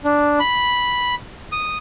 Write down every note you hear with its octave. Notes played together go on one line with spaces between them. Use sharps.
D4
B5
D#6